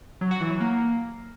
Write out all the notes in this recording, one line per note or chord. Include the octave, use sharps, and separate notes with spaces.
F#3
F#4
E3
F#3
A#3